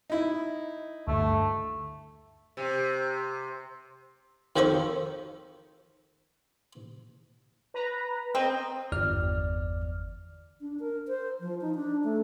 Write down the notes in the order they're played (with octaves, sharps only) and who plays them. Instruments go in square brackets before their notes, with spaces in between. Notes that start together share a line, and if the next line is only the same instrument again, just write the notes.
[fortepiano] D#4 E4
[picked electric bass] D2 G2 D3 [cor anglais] A3
[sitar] C3
[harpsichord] F2 D#3 F3 A4 B5 C#6
[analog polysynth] B4 A#5
[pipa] C4 [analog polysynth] D#5
[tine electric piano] G1 E2 D5 F6
[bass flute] D4
A#4
C5
F3
D#4
D4
A3